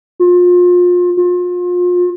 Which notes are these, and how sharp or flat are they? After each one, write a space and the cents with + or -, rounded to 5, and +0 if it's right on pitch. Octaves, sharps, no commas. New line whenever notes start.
F4 +30
F4 +35